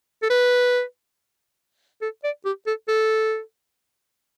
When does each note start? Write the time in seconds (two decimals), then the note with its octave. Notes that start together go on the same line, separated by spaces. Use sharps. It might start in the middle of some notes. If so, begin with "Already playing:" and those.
0.22 A4
0.30 B4
2.01 A4
2.23 D5
2.45 G4
2.67 A4
2.88 A4